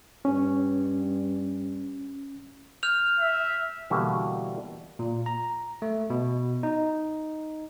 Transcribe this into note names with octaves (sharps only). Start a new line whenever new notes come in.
G2 C#4
F6 G6 F7
E5
B2 D3 E3 G3 A#3 F#4
A#2
A#5
A3
B2
D#4